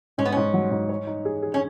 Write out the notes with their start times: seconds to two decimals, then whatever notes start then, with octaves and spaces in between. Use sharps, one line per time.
0.18 G#2 C#4
0.25 B3
0.32 G#2 C#4
0.54 F#3
0.71 G#2
0.89 C#5
1.07 D#4
1.25 G#4
1.42 G#4
1.54 C#4